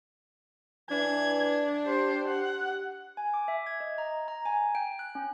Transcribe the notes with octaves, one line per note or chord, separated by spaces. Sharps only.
E3 D4 G#6
G4 C5
F#5
G#5
D6
E5
G#6
D#5
A#5
A#5
G#5
G5
F#6
C#4